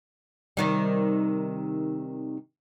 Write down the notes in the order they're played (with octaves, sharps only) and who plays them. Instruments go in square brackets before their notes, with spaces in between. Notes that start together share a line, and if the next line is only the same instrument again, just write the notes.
[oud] C3 D#3 G3